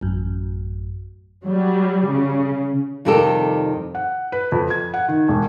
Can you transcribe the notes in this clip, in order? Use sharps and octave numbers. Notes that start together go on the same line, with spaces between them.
A1 F#2
F#3 G3
C#3
F2 C3 D#3 G3 G4 A4
F#5
B4
F2
G#6
F#5
D#3
E1